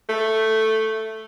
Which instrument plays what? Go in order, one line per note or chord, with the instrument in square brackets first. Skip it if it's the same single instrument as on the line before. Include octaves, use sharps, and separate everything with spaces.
[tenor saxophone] A3